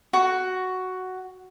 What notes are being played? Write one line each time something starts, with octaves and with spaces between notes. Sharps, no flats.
F#4